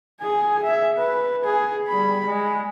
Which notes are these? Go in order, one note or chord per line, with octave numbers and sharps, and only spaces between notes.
G#4 G#5
E5
B4
G#4
G3 B5
G#3